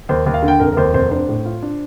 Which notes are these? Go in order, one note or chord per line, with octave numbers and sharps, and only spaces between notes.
D#2 C5
D#2
F5
D3
G5
F1 A#4
A#4
D#2 C5
F1 C5
D4 C5
A2
F4
D4